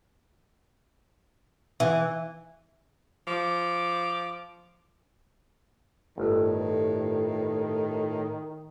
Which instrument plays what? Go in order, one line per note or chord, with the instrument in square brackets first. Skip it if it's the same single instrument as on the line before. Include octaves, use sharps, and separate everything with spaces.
[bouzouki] E3
[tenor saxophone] F3 [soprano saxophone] D6
[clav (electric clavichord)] G1 [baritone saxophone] A2 [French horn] D#3